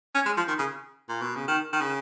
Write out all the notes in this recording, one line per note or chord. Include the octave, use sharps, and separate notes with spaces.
C#4
G#3
F3
D#3
C#3
A#2
B2
C#3
D#3
D#3
C#3